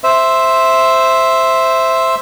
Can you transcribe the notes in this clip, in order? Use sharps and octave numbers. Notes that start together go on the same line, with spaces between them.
C5 E5